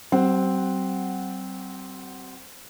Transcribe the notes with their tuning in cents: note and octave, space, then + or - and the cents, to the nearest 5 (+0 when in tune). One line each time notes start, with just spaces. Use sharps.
G3 -45 C4 +0 F#5 +0